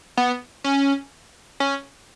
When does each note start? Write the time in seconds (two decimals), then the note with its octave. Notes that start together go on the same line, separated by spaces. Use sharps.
0.17 B3
0.64 C#4
1.60 C#4